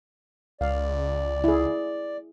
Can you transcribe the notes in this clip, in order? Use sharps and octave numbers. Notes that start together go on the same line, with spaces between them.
C#2 D5 F5
E4 G#4